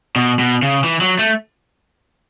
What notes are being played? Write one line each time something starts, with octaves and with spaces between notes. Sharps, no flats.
B2
B2
C#3
E3
F#3
A3